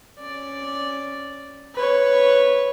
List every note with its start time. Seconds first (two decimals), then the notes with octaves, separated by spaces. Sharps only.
0.19 C#4 D5
1.75 B4 C#5